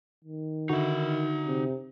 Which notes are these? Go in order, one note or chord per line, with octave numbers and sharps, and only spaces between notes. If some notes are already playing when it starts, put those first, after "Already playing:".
D#3
D3 D#4 F#4 E5
C3